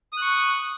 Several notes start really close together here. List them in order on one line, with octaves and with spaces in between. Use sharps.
D#6 F#6 C#6